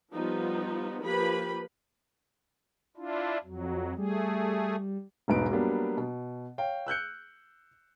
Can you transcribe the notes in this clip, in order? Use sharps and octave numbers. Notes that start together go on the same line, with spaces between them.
F3 G3 B3 D#4 F4
F3 A#3 G4 B4 B5
D4 E4 F4
F2 F#3
G3 A3 G#4
E1 B1 E2 G#2 B4 D7
F#3 G3 A#3 B3 D4
B2
C#5 F5 G5
E6 F#6 G6 C#7